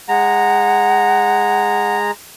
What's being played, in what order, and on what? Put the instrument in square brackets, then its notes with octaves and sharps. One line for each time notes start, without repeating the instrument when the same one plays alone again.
[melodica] G#3 A#5 [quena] F#5